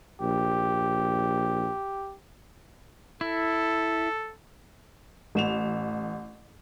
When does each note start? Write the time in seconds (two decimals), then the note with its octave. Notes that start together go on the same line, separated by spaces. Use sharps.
0.22 A#1 G4
3.21 E4 A4
5.35 A1 E7 F7